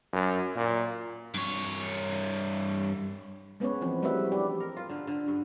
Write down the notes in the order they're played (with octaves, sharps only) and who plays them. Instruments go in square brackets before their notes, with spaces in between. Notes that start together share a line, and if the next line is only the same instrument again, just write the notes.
[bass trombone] F#2
A#2
[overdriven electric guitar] G2 C#5
[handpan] G#3 B3 C#4 B4 C#5
E3 F3 C4
G3 A3 C4 F#4 B4 E5
D4 G4 D5
[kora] A#4
F4
D3
D3
G2